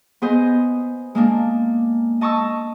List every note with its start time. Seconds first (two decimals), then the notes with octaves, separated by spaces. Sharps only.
0.22 B3 G#4 C5 D#5
1.15 G#3 A#3 D4
2.21 D#5 A5 C#6 D#6 E6